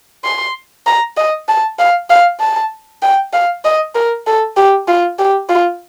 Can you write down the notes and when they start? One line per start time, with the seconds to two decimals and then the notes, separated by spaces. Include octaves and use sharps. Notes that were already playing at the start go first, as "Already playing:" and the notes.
0.24 C6
0.87 A#5
1.17 D#5
1.48 A5
1.79 F5
2.10 F5
2.40 A5
3.02 G5
3.33 F5
3.64 D#5
3.95 A#4
4.26 A4
4.57 G4
4.88 F4
5.19 G4
5.49 F4